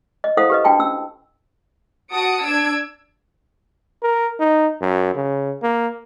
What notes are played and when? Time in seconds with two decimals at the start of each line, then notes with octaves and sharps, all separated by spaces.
0.24 D#5
0.37 E4 A4 C5 F5 F#5 D#6
0.50 G4 B4 D#5
0.64 D4 F#4 G5 A5
0.79 C#4 E6
2.14 F#4 A5 D#6 C#7 D7
2.43 D4 E6 G#6 D7
4.03 A#4
4.40 D#4
4.81 F#2
5.15 C#3
5.62 A#3